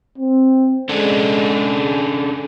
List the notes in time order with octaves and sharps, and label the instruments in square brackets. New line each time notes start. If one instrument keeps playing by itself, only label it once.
[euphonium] C4
[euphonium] G#3 [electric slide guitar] C#4 D4 A4